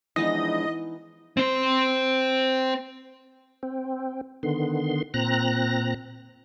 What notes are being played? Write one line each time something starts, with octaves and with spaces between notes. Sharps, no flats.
E3 F3 G#3 B3 D4 D#4 D#5
C4 C5
C4
D3 D#3 B3 C6
A#2 C4 A#5 F#6 A#6